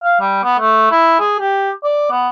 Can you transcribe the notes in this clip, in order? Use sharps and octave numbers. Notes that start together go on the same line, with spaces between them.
F5
G3
B3
A3
E4
G#4
G4
D5
B3